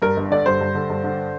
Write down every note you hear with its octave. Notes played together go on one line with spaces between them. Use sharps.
G2 A#4
G1
D3 D5
G2 C5
G2
D3
G2
D3